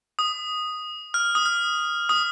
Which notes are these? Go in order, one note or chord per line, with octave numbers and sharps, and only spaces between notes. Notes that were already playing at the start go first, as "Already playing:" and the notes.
D#6
F6
D#6
F6
D#6